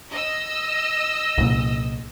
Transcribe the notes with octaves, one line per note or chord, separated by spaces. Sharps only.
D#5 E6
C2 A#2